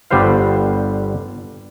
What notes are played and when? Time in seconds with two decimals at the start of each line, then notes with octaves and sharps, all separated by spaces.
0.11 G1 D3 G3 B4 C5 F5